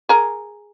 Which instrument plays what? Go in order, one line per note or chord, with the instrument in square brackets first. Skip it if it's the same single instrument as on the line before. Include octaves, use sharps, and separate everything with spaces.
[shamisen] G#4 A#4